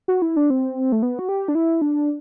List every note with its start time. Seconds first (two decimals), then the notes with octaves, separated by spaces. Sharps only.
0.08 F#4
0.22 E4
0.36 D4
0.50 C4
0.92 A3
1.03 B3
1.19 F#4
1.29 G4
1.48 D4
1.55 E4
1.82 D4